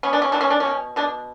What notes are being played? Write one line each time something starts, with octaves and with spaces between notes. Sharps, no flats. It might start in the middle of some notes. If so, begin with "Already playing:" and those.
B3 C#4
D4
C#4
F#3 D4
C#4
D4
B2 C#4
B2 D4